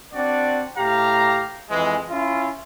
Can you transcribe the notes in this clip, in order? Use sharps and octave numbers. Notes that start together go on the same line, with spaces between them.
C4 D4 F#4 D5
A2 G4 F5 A#5
F2 E3 G#3
C#4 E4 F4